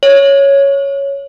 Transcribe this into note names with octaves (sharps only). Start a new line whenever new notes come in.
C#5